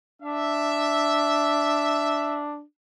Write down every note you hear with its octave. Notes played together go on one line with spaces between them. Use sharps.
D4 E5